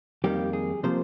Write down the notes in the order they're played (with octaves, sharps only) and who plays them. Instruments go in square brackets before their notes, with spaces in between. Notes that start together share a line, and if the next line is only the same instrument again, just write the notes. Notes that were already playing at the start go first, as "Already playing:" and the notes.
[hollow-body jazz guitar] F2 D#3 G3 A#3 G4
G#4
C3 F3 A#3 C5